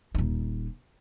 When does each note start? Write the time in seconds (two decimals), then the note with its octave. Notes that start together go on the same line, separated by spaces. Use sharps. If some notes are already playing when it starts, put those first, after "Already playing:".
0.15 D#1 D#4